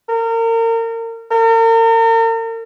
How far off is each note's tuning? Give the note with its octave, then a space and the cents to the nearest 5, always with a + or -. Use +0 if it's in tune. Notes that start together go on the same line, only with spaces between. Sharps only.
A#4 -35
A#4 -40